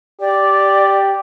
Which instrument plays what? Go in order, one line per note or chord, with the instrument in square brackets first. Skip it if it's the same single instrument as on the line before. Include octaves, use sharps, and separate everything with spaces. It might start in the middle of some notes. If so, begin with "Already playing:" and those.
[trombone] G4 [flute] D5